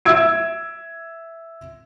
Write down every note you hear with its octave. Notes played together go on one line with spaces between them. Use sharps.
E5 E6 G#6 D7